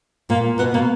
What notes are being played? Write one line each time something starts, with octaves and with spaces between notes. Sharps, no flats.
A#2 A#3
B2 B3
B2 A#3